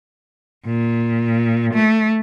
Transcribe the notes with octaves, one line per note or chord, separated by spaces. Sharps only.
A#2
A3